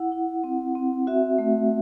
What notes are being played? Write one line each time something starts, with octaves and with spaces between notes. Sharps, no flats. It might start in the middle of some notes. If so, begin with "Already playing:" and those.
Already playing: E4 F#5
E4
C4
C4
F#4 E5
A3